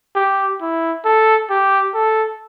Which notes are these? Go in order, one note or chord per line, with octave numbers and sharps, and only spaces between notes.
G4
E4
A4
G4
A4